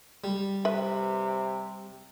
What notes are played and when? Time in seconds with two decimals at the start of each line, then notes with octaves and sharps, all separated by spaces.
0.24 G3
0.65 C3 B4 E5